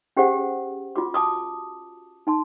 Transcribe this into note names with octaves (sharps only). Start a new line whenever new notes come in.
C#4 G4 G#4 C5 F#5
F4 F#4 D6
A5 D6 D#6
D#4 A5 C6